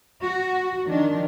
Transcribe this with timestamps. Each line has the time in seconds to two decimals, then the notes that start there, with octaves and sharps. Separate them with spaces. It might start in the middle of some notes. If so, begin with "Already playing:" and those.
0.22 F#4
0.85 D#3 F3 D4